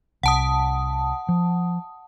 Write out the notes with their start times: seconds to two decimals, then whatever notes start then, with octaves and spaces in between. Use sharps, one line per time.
0.23 C2 F#5 A5 D#6
1.29 F3